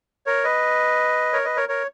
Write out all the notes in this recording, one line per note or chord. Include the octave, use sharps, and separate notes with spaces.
A#4 C#5
B4 D#5
A#4 C#5
B4 D#5
A#4 C#5
A#4 C#5